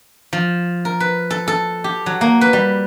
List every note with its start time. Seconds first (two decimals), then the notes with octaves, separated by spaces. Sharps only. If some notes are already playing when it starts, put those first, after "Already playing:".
0.33 F3
0.85 A#4
1.00 B4
1.30 A4
1.48 A4
1.84 G4
2.06 F#3
2.21 A#3
2.41 B4
2.53 G3